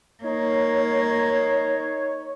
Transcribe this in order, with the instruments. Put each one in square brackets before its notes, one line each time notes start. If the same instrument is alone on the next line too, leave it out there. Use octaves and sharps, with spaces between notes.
[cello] A#3 [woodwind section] D#4 C#5